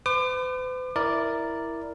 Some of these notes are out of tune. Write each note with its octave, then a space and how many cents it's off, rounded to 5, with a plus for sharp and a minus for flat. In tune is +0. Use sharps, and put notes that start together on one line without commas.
B4 +45 D6 +35
E4 +0 A#4 +0 D5 +0